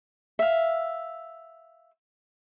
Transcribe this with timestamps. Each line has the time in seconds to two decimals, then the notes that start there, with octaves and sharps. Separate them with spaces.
0.39 E5 F5